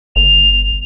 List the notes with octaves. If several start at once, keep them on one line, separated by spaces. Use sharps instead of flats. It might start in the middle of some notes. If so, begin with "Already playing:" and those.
G1 F7